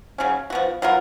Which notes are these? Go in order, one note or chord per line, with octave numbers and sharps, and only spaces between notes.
C#3 F#3 C#4
F3 B3 F#4
F#3 B3 F4 A#4